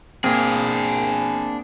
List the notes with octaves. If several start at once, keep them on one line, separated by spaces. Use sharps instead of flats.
A#3 C4 D4 G#4